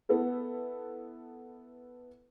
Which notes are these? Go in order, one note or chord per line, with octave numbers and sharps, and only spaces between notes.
B3 E4 A4 B4